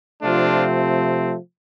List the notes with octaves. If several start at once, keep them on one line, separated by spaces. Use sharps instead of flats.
C3 F3 A3 C4 D4 F4